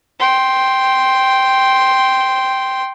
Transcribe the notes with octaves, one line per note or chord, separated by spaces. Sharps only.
G5 C6